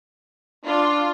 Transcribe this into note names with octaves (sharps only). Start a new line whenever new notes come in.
D4 F4